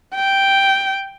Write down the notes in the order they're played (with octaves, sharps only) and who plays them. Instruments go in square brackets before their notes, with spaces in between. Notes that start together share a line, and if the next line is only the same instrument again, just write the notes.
[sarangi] G5